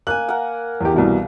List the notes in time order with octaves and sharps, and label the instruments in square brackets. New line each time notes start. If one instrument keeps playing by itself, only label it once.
[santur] A#3 G#5 [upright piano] F#6
[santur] A#4 F#5
[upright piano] E2 G4
C2 B2 E3